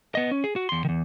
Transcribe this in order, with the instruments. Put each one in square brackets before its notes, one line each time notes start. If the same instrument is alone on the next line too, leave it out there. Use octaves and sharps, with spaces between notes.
[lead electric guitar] B3 D#5
C#4
G#4
F#4
E2 C6
E2 D#3